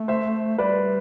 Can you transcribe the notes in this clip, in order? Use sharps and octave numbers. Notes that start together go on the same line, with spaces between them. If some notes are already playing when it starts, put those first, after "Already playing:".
Already playing: A3
C5 E5
G3 B4 D5